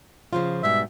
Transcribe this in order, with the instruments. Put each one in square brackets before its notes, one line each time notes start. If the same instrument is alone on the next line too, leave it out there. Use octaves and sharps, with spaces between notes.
[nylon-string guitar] C#3 F3 F4
[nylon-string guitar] G#2 B2 G3 [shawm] E5